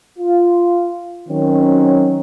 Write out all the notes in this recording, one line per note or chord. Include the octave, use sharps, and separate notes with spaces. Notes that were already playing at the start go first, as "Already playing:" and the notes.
F4
D#3 F#3 C4 C#4